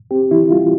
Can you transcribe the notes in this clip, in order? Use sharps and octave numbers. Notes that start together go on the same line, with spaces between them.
C4 G4
E3 E4
G3 F4